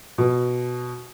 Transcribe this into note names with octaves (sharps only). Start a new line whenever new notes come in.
B2